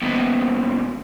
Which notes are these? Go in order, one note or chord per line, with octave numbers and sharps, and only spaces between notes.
D#2 B2